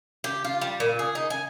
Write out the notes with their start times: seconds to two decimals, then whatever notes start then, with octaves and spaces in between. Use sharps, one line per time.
0.24 G4
0.45 F4
0.61 G3
0.80 A#2
0.99 G#4
1.15 D#4
1.30 G#5